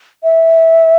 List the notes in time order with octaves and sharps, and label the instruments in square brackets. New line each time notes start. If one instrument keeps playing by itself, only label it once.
[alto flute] E5